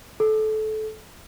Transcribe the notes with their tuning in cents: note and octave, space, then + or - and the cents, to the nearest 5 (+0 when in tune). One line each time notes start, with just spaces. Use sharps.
A4 -20